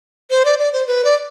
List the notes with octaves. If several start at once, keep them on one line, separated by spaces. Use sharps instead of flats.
C5
D5
D5
C5
B4
D5